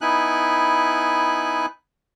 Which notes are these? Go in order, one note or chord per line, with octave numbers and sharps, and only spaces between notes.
B3 D#4 E4 G#5 F#6